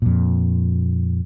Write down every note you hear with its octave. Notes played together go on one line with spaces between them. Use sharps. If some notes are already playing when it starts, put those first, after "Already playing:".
F2 A#2